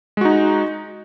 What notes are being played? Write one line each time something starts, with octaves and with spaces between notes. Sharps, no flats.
G#3 D#4 F#4